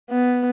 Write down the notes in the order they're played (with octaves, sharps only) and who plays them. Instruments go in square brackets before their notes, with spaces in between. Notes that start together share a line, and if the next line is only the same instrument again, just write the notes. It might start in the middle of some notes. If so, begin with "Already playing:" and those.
[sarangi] B3